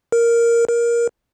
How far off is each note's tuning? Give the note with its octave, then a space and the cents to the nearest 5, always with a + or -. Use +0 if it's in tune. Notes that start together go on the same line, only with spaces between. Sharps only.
A#4 +0
A#4 +15